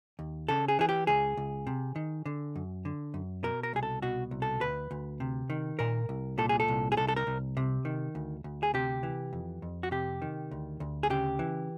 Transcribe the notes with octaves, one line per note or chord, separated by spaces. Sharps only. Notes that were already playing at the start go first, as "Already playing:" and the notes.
D#2
C#3 A4
G#4
E3 G#4
G4
C#2 G#4
C#2
C3
D#3
D3
F#2
D3
F#2
B2 A#4
A#4
C2 G#4
A4
B2 F#4
C2
A4
D2 B4
D2
C3
D#3
A#2 A#4
C2
A#2 A4
G#4
A4
C2
G#4
C2 A4
A4
A#4
C2
C3
D#3
D2
D2
G#4
C3 G4
E3
F2
F2
F#4
C3 G4
D#3
D2
D2
G#4
C#3 G4
E3